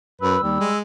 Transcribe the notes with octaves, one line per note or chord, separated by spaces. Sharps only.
F#2 B4 E6
D#2 G3
G#3